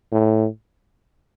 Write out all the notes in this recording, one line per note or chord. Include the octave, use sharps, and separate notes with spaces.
A2